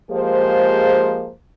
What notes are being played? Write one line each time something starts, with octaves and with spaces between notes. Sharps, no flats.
F3 G#3 A#3 G4 G#4 C5